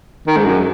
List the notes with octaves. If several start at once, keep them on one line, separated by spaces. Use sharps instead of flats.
D#3
G#2
F#2